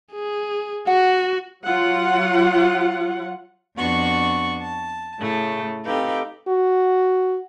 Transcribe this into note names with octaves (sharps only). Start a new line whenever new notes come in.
G#4
F#4 F#5
F#3 F4 F#5
F2 B3 D4 F#4 C#6
A5
A2 C#3 A3
C4 D#4 G4 A4 B4 F5
F#4